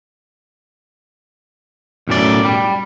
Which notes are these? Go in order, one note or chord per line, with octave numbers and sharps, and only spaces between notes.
B1 F#2 A2 D5
G3